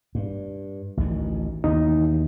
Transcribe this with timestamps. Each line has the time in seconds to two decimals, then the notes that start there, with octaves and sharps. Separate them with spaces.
0.15 G2
0.97 A1 D2 D#3
1.64 D#2 B2 E3 D#4